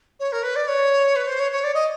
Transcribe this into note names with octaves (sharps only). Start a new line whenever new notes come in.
C#5
A#4
B4
D5
C#5
B4
C5
C#5
C#5
D5
D#5